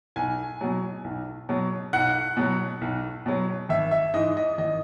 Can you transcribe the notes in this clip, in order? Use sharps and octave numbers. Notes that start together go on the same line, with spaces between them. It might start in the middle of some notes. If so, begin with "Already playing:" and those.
B1 G#5
B2 F#3
B1
B2 F#3
B1 F#5
B2 F#3
B1
B2 F#3
G#1 E5
E5
G#2 E3 D#5
D#5
G#1 D#5